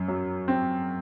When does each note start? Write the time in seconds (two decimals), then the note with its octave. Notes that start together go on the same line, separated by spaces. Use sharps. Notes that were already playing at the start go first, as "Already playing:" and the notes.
Already playing: F#2
0.08 F#3
0.48 C4